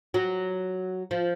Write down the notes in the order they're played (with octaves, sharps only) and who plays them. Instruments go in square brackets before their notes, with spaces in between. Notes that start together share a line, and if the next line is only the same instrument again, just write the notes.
[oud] F#3
F3